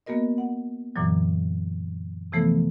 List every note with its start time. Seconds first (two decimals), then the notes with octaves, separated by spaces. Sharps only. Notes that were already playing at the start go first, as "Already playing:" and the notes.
0.06 A#3 B3 F#4 A#4 D#5
0.38 F#5
0.96 F#2 A#2 D3 E3 F#3
2.32 C3 E3 F3 A3 B3 A4